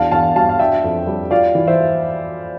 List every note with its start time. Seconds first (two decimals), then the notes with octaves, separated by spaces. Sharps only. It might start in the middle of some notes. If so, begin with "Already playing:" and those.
Already playing: E2 D4 F5 A5
0.11 E2 F5 A5
0.36 G3 F5 A5
0.49 F5
0.59 D4 E5 G5
0.84 F2
1.07 G3
1.31 F4 D5 F5
1.55 E3
1.67 C5 E5